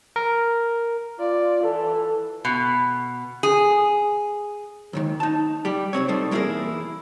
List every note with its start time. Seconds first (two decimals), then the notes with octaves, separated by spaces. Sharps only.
0.16 A#4
1.20 F4 D5
1.64 E3 A4
2.45 B2
3.43 G#4
4.93 D#2 G#2 D#3
5.20 D#4 A5
5.65 G3 G4
5.93 C2 F2 C4 C#5
6.08 G3 D#4 A4 C5
6.31 E2 A#3 E4 G4 G#4 A#4